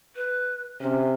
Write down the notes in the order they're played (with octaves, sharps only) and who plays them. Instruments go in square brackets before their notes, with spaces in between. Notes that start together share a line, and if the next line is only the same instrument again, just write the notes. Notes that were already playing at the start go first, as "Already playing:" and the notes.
[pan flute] B4
[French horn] C3 [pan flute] C#4